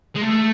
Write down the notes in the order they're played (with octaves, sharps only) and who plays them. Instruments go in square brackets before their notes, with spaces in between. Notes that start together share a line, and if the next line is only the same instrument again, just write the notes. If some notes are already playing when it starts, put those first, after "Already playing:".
[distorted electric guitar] G#3
A3